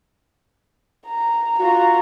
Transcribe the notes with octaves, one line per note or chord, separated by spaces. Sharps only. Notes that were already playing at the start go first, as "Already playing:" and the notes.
A#5
F4 F#4 A#5